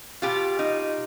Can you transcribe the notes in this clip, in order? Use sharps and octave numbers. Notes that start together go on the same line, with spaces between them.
B2 F4 G4
D#4